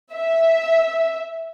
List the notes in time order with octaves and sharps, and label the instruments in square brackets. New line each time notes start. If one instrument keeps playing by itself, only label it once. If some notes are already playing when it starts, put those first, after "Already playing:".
[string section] E5